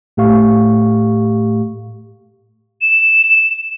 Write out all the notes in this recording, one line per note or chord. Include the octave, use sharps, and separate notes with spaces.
A2 A3 G4 F5 C#6
E7